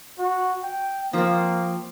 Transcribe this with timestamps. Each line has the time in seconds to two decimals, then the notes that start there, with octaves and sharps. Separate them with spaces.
0.19 F#4
0.63 G5
1.13 F3 A#3 C4